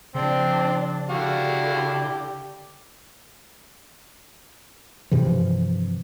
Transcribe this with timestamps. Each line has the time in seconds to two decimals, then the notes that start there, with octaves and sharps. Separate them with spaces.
0.15 C#3 F3 C4 D4
1.09 D3 E4 F#4 G4 F5
5.11 G2 C3 E3 F3